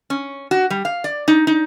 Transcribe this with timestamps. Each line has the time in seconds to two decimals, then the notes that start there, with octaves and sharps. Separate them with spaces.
0.10 C#4
0.51 F#4
0.70 G3
0.85 F5
1.04 D5
1.28 D#4
1.47 D#4